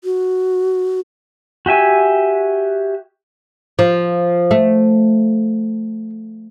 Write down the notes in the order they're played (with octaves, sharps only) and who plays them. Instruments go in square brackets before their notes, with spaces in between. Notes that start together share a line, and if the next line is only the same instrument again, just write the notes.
[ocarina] F#4
[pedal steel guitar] F#4 G4 E5 G#5
[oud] F3
A3